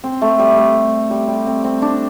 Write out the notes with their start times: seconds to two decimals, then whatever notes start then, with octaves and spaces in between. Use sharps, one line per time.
0.04 C4
0.22 A3
0.39 G3
0.57 A3
1.11 G3
1.28 G3
1.47 C4
1.64 C4
1.82 D4